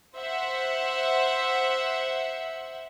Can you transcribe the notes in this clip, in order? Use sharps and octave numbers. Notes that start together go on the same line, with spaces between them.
C5 E5 F#5